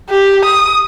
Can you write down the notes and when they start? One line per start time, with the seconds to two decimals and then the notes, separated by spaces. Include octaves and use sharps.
0.10 G4
0.45 D#6